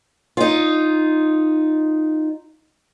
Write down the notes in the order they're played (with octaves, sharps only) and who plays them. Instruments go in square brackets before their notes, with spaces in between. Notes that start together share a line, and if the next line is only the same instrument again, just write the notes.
[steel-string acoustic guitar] D#4 F4